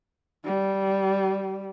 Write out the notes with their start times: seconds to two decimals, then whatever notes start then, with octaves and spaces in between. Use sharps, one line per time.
0.44 G3